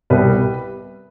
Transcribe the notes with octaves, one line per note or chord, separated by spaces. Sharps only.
C2 B2 G3 B4